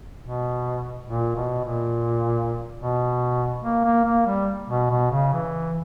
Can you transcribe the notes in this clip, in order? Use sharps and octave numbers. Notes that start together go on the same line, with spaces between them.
B2
A#2
B2
A#2
B2
A#3
A#3
A#3
G3
B2
B2
C#3
E3